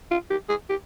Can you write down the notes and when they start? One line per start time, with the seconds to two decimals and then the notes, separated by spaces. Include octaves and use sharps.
0.11 F4
0.30 G4
0.49 G#4
0.69 G4